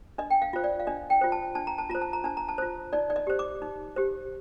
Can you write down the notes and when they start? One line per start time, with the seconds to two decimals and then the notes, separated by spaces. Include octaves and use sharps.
0.18 D4 D#5
0.31 G5
0.42 F5
0.53 F4 C5
0.64 D5
0.79 F5
0.87 D4 D#5
1.10 G5
1.21 F4 C5
1.32 A5
1.55 D4 A5
1.67 A#5
1.78 A5
1.90 F4 C5 A#5
2.02 A5
2.13 A#5
2.24 D4 A5
2.37 A#5
2.48 A5
2.58 F4 C5
2.93 D#4 D5
3.10 D5
3.16 D#5
3.27 G4 C5
3.39 D6
3.62 D#4
3.96 G4 C5